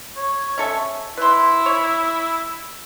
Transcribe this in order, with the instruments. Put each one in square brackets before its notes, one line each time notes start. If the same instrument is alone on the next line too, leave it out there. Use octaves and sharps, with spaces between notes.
[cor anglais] C#5
[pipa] C#4 A4 E5
[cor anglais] E4 [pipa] B4 C6
[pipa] C#5